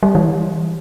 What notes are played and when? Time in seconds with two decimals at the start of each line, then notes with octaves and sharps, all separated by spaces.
0.03 G3
0.15 E3